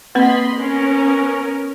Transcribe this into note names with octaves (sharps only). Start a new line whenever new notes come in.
A#3 C4 B4 D#5 B5 C6
B3 C#4 A#4